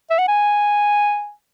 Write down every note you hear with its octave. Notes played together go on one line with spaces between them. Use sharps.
E5
F#5
G#5